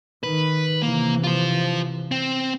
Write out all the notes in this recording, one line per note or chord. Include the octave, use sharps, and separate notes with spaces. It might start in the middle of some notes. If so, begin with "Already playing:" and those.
D#3 B4
C3 E3 A#3
F4 C5
C4